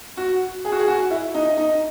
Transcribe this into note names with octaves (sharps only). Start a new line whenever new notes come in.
F#4
G#4
F#4
G#4
F#4
E4
D#4
D#4